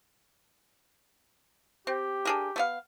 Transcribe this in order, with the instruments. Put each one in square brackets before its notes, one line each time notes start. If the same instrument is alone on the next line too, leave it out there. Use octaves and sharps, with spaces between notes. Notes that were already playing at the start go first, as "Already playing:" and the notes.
[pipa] C4 [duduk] G4
[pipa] D4 G#4 A#4
A3 B3 F5